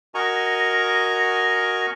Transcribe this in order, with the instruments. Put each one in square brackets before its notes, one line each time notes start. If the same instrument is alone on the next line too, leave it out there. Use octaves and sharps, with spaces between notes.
[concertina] F#4 A#4 D#5 G#5 A#5 C#6